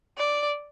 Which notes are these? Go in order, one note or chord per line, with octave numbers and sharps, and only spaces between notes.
D5